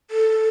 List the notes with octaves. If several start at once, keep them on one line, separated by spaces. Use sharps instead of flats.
A4